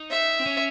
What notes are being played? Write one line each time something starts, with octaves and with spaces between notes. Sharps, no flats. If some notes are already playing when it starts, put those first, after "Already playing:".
Already playing: D#4
E5
C4
C#4